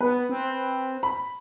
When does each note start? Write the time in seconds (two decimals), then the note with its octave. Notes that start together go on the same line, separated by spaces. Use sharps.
0.01 B3 B4
0.29 C4
1.03 B5